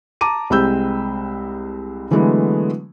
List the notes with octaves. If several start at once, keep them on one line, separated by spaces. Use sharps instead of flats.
A5 A#5 D6 D#7
C2 G#3 C4 B5 E6 G6
D3 E3 F#3 G#3 A3 B3